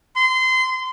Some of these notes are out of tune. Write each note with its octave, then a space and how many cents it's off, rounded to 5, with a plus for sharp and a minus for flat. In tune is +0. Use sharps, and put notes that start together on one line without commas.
C6 -25